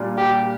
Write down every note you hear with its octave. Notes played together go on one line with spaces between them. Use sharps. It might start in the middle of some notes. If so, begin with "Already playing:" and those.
Already playing: A#2 G3 D4 F4
G4